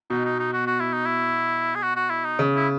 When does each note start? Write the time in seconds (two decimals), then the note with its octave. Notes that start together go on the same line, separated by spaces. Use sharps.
0.10 B2 D#4
0.25 D#4
0.40 D#4
0.54 F#4
0.67 F#4
0.80 E4
0.93 D#4
1.06 E4
1.75 G#4
1.82 F#4
1.96 F#4
2.10 E4
2.25 D#4
2.39 C#3
2.56 E4